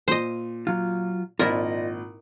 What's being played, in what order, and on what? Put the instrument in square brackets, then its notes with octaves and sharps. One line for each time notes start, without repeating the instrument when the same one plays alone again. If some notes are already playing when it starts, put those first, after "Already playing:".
[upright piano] A#2 [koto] C5 D#5
[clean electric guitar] F#3 F4
[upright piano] G#1 A#2 [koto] E4 A#4 [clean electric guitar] F4 D5 D#5